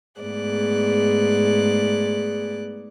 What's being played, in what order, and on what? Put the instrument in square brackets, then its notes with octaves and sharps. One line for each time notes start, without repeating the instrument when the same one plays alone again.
[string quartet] G#2 A3 B3 G#4 D5 F#6